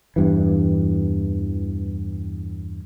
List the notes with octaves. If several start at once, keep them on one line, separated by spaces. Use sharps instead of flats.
E2 G2 E3